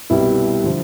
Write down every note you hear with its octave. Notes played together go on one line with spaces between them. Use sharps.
C2 B2 G3 E4
D3 F3